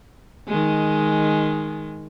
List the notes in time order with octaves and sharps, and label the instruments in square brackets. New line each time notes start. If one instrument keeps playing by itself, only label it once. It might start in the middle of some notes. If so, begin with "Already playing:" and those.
[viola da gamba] D#3 G#3